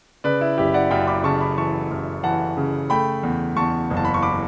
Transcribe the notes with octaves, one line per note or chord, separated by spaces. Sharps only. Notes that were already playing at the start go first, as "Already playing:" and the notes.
C#3 B4 D5
E4
F#1 E4 G4
D5 F#5
F#2 G5 B5
B5 D6
C#3 A5 C#6
B5 D6
E3 A5 C#6
F#2
E3 F#5 A5
C#3
A3 G5 B5
E2
E2 A5 C#6
F#1
A5
B5
C#6
B5 D6